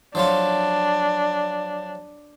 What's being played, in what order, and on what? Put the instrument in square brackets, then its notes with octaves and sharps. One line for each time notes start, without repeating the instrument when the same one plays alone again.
[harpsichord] F3 F#3 F4 [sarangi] D4